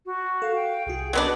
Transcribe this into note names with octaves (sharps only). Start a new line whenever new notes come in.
F#4
A4 F5
G5
C2 F#4 G#4
F#3 B3 D4 D#5